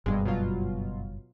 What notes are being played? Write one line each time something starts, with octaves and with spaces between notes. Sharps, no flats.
F#1 G2 B2 G3 G#3
B2 F#3 F4